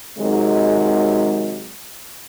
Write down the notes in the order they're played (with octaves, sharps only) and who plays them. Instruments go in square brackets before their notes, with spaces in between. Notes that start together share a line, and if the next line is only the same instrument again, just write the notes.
[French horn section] C3 D#3 F#3 G#3